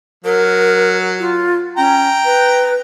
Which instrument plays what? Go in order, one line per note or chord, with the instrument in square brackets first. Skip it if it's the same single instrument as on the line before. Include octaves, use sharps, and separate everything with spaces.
[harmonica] F#3 [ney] A#4
[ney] F4
[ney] C#4 [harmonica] G5 A#5
[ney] B4